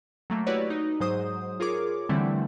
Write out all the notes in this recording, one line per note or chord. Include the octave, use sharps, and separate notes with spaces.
F#3 A3 A#3
E4 F#4 G4 B4 C#5 D5
D#4
G#2 F#3 C5 D#6
F4 G#4 A#4 C#5 D6
D3 E3 G3 A3 C4 E4